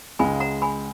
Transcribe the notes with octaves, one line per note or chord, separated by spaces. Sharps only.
C#2 C#3 G#3 G#5 B5
F#5 A#5
G#5 B5